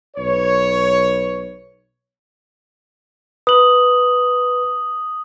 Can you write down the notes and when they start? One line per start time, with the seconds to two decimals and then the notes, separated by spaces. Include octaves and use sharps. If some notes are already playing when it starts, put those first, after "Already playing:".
0.16 B1 B4 C#5
3.47 B4 D#6 F#7